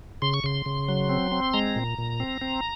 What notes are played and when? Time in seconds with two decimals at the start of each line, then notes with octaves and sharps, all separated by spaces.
0.22 C#3 C6
0.34 C#6
0.44 C#3 C6
0.66 C#3
0.88 F#3
1.09 C4
1.32 C4
1.54 G#3 A#5
1.76 A#2
1.98 A#2
2.20 C4
2.41 C4